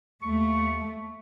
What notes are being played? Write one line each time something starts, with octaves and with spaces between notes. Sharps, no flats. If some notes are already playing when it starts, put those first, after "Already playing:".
D#2 A3 C#6